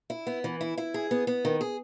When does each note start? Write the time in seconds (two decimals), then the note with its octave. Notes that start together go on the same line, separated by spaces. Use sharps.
0.10 E4
0.27 B3
0.44 E3
0.61 E4
0.78 E4
0.94 G#4
1.11 B3
1.27 B3
1.45 D#3
1.61 G#4